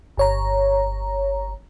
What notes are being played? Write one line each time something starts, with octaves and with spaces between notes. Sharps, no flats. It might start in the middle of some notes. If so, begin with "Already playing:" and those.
G1 C#5 A#5